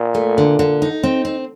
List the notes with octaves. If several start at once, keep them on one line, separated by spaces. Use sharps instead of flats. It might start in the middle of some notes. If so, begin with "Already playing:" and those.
Already playing: A#2
A3
D3
D3
D#4
C4
C4